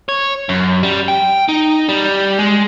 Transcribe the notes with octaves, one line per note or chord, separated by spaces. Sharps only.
C#5
F#2
G3
G5
D#4
G3
G#3